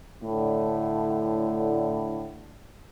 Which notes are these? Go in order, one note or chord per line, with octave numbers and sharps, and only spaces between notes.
A2 D3